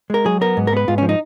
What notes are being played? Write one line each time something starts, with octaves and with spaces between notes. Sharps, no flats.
G#3 A#4
F#3 G#4
B3 A#4
G#2
A#4
B3 B4
G#2 F4
F3 C#4
D#4